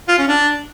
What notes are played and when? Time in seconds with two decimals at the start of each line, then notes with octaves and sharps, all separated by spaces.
0.08 F4
0.18 C#4
0.29 D4